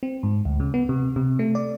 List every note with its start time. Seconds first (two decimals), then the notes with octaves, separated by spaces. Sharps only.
0.03 C4
0.23 G#2
0.45 D2
0.60 C#3
0.74 B3
0.89 C3
1.16 C3
1.39 A3
1.55 D5